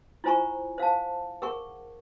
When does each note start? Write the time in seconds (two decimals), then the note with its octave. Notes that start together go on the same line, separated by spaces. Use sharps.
0.24 E4 F4 C5 G#5 A#5 C#6
0.78 C5 F5 F#5 A5
1.42 G#4 A#4 F#5 C#6